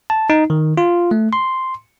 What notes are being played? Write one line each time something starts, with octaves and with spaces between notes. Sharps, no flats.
A5
D#4
D#3
F4
A3
C6